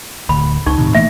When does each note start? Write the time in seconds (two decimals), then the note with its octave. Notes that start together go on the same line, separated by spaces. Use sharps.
0.29 D1 D2 B5
0.66 C#2 D#4 C#6
0.78 A2 C3 D#3
0.95 E3 A3 A#3 E5